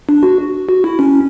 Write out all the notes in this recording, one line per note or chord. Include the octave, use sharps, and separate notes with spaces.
D4
F#4
F#4
E4
C#4